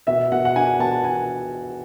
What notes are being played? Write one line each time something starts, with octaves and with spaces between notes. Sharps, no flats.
B2 E5
B2 F#5
F#5
D4 G#5
B2 A5
D4 G#5